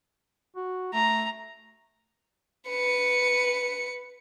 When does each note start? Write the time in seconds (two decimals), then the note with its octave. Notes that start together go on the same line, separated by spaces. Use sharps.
0.56 F#4
0.93 A3 A#5
2.69 B4 C#7